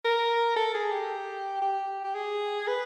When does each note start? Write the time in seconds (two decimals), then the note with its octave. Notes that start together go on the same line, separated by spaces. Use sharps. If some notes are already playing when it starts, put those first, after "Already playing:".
0.05 A#4
0.56 A4
0.74 G#4
0.92 G4
1.62 G4
2.04 G4
2.15 G#4
2.67 B4